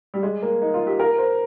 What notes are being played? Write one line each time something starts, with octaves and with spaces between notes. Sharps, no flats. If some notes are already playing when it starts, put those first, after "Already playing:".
G3
G#3
A#3
D#4
F4
G4
A#4
C5